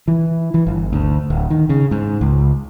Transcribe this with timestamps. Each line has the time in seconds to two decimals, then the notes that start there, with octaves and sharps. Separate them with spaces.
0.08 E3
0.54 E3
0.67 G1
0.93 D2
1.30 D1
1.50 D#3
1.69 C#3
1.91 G#2
2.21 C#2